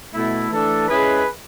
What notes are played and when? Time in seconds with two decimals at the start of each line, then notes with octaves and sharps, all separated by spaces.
0.13 B2 A3 E4
0.51 E3 A3 D4 A4
0.88 G#3 C#4 E4 G#4 B4